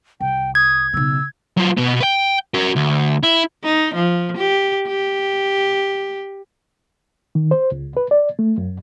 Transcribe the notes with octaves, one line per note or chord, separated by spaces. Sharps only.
C2 G5
D#6 G#6
B1 C#3 E6
F#3 F4
B2 B3
B4 G5
F#4 A#4
D2
E4
D#4
F3
G4
G4
D#3
C5
C#2
B4
D5
A3
F#2